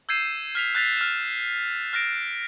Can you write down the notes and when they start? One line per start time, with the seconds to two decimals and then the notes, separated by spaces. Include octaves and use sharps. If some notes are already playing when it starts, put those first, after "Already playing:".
0.09 E6 G6 G#6 C7 D#7 E7
0.55 F6 B6 F7
0.75 F#6 G6 A6 B6 C7 F7
0.97 F6 E7
1.93 F6 F#6 A#6 D7